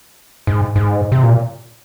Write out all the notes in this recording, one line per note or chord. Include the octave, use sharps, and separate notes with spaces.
G#2
G#2
C3
A#2